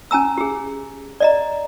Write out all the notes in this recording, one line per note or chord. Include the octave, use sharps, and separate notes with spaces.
C#4 G#5 A#5 E6
G4 G#4
D5 D#5 A#5